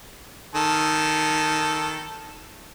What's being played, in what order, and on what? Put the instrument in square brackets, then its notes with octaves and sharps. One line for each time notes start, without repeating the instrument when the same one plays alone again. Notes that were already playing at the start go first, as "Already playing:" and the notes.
[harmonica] D#3 A4